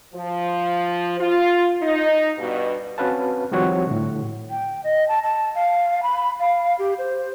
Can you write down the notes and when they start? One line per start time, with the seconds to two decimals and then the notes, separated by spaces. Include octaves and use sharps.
0.13 F3
1.19 F4
1.82 D#4
2.38 G2 B2
2.98 C4 C#4 F#4 B4 F5 A5
3.52 D#3 F3 G3 C4 F#4 C#5
3.87 A2 D3
4.50 G5
4.84 D#5
5.08 A5
5.24 A5
5.55 F5
6.03 B5
6.39 F5
6.79 G4
6.98 C5